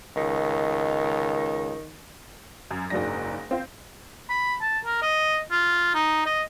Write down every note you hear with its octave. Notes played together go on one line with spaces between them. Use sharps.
C#2 D#3
F#2
F#1 G#2 C#3 F#3 D4 A#6
C4 F4 C5
B5
A5
A#4
D#5
F4
D#4
D#5